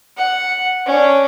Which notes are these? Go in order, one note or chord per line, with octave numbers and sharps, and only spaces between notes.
F#5
C#4 D4